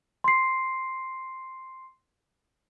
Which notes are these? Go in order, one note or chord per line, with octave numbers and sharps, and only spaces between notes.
C6 C7